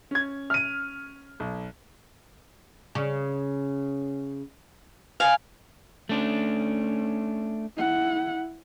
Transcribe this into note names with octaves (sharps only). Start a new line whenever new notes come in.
C#4 G#6
F6 D#7
B1
C#3
F5 G#5
A3 C#4 D4
E4 F#5